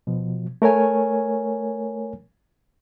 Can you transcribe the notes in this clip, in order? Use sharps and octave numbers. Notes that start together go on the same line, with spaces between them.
B2 F3
A3 A#4 C#5 G#5